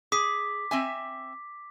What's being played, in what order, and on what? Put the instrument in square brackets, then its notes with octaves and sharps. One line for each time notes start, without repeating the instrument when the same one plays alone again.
[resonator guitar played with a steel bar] G#4 [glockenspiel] D6 B6
[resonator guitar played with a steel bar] C4 E5 G#5